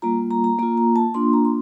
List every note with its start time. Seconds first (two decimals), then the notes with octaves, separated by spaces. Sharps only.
0.02 G3 A#3 F4 A#5
0.31 A#5
0.44 A#5
0.59 A#3 F4 A#5
0.77 A#5
0.96 A5
1.14 A#3 D4 F4 C6
1.33 A#5
1.45 C6